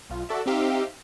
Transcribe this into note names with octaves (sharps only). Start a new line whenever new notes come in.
B1 F4
F#4 A4 D5 E5
C4 D#4 G4 E5 F5